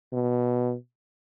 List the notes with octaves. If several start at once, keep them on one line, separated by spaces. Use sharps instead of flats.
B2